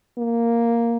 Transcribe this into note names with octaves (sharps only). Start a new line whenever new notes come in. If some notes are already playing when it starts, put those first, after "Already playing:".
A#3